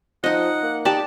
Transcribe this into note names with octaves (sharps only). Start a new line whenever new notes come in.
F3 D#4 D#5 F#5
A#3
D#4 G4 D5 A5